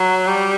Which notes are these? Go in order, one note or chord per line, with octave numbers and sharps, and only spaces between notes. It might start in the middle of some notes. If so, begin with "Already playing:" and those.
Already playing: F#3
G3